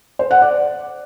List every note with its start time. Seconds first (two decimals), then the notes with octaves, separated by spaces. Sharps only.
0.19 C5
0.31 F#5
0.42 D5